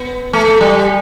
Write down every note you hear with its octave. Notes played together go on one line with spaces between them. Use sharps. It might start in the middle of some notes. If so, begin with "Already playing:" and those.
Already playing: B3
A3
G3